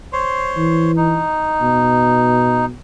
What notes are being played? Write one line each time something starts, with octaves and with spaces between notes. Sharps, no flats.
C5 C#5 C6
E3
D#4
B2